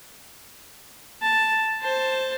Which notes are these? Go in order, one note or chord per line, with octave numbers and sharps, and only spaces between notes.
A5
C5 A5